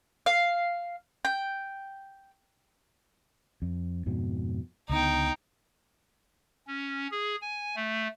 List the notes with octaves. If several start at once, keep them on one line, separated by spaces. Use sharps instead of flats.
F5
G5
F2
F2 G#2 B2
C#2 D3 B3 D#4 G5
C#4
G#4
G#5
A3